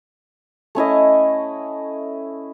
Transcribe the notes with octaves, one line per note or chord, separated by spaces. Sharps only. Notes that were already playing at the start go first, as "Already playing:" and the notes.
A3 C#4 E4 D#5